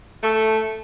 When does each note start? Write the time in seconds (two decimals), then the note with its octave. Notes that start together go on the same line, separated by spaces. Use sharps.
0.22 A3